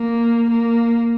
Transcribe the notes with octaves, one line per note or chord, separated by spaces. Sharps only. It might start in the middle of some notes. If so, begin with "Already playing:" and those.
Already playing: A#3
A#3